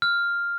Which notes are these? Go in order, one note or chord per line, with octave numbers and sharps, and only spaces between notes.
F6